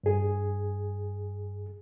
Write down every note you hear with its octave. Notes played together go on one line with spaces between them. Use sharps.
G2 G#4